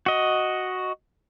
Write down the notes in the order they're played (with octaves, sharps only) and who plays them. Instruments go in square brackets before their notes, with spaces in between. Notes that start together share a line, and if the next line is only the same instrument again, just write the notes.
[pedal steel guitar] F#4 D#5